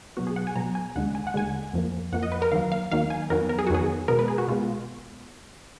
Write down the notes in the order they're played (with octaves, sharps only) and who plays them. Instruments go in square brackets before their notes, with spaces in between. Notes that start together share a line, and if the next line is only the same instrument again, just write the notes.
[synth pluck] B2 F#3 B3 F#4
G#4
F#5
G#5
B2 F#3 B3 A#5
G#5
D#2 D3 G#3 F#5
G#5
F#5
D#2 D3 G#3 G#5
F2 F3 A#3
F2 F3 A#3 F#5
D#5
B4
A#4
D#2 D#3 F#3 A#3 F5
F5
D#2 D#3 F#3 A#3 F5
G#5
F2 D#3 F#3 B3 A#4
A#4
G#4
F#4
F2 D#3 F#3 B3 G#4
B2 G#3 B3 A#4
B4
G#4
F#4
B2 G#3 B3 F4